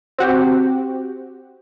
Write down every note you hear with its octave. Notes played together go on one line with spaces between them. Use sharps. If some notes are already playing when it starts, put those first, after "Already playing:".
C4 F#4 G4